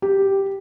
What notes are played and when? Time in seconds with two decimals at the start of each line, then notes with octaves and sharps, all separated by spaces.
0.02 G4